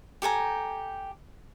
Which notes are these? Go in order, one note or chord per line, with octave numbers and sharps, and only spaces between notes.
G4 A4 G#5 A#5